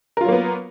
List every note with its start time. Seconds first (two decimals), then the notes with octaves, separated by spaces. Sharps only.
0.17 A#4
0.21 F4
0.25 F#3
0.28 A#3
0.32 B3